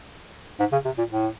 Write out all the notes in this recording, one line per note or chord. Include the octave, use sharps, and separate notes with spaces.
G#2
C#3
C3
A#2
A2